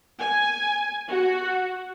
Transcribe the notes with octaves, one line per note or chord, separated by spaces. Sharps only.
G#5
F#4